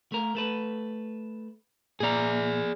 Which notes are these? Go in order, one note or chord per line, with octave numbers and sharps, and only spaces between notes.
A3 A#4
A3 A4 B4
A#2 A#3 G#4 D5 A#5